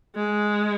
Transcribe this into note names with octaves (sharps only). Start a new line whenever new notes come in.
G#3